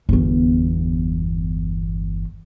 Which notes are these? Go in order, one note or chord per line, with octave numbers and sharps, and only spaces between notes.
G1 E2